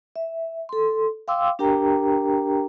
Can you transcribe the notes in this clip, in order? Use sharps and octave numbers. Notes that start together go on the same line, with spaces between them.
E5
A4 C6
F5 G5 C6 D6 E6
D4 G4 A#4 G5 A#5